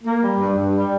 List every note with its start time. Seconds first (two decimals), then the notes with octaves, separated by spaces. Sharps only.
0.04 A#3
0.22 G3
0.39 G2
0.56 G2
0.74 G3